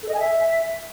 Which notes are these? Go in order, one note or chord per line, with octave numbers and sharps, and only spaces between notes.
A4
D#5
G#5
E5